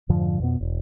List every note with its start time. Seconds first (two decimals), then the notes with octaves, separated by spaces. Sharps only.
0.09 F2 G#2 D3 F3
0.40 F2 B2 B3
0.61 E1